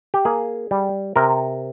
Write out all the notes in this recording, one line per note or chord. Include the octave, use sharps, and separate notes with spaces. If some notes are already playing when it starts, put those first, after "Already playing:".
G4
A#3 G#4
G3
C3 A#4